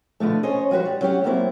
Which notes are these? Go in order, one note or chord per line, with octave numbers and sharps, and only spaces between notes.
B2 D3 F3 A3
C#4 C5 C#5 D#5
F3 G3 F#4 B4 C5
G3
F#3 C#4 G4 F#5
F#3 G3 A#3 C4 E4